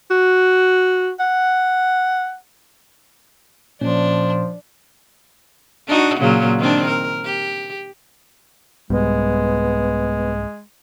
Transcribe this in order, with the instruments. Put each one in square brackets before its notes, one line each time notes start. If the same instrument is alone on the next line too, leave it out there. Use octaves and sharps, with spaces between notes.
[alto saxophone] F#4
F#5
[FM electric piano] A#2 C#4 [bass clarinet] F3 [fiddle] D4
[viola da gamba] D4 D#4 F#4
A#2 C#3 F#3
D#3 C4 D4
A#4
G4
[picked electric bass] C2 G#2 G3 [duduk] G#3 [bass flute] B3